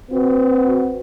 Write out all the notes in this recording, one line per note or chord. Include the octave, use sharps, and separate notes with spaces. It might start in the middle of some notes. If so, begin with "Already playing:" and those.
C4 F#4 B4